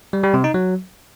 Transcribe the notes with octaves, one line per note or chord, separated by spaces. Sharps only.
G3
G3
C3
D#4
F#3